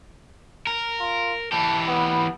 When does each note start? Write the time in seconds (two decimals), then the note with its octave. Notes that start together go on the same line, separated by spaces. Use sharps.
0.67 A#4
1.00 F4
1.52 E3 G4 A5
1.87 B3